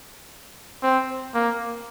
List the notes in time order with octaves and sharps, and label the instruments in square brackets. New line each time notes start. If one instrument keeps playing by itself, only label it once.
[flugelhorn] C4
A#3